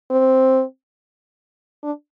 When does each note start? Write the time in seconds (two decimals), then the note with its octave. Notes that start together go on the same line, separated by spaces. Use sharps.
0.11 C4
1.83 D4